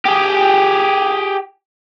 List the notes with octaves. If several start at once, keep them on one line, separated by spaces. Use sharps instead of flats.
G4 G#4